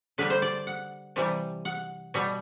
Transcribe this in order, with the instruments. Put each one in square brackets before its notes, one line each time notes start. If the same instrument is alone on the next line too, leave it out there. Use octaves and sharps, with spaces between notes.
[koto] D3 G3 B4
C5
D5
F#5
C3 E3 G3
F#5
B2 G3